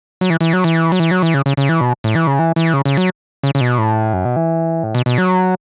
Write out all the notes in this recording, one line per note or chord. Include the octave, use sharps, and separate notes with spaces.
F#3
E3
E3
F#3
E3
F#3
E3
F#3
E3
C#3
C#3
C#3
E3
B2
A2
E3
C#3
E3
E3
C#3
C#3
F#3
C#3
C#3
B2
A2
F#2
B2
E3
A2
B2
B2
F#3